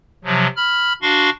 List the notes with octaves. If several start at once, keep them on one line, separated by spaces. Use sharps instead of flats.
C3 F3 F#3
B5 F6
D4 F#4 F5 C6 C#6